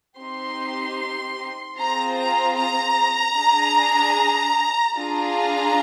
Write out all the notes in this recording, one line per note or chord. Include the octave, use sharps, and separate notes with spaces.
C4 D#4 G4 C6
C4 F4 G#4 A#5
A#5
A#5
D4 G#4
D4 F4 G#4 A#5